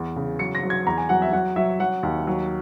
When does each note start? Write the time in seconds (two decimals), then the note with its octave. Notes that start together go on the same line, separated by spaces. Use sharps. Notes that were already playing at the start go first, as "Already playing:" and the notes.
Already playing: E2
0.16 C#3
0.39 F#3 C#7
0.55 A#6
0.63 F#3
0.70 G#6
0.86 E2 A#5
0.98 G#5
1.09 F#3 F#5
1.22 E5
1.32 F#3 F#5
1.56 F#3 E5
1.80 F#3 F#5
2.03 D#2
2.27 F#3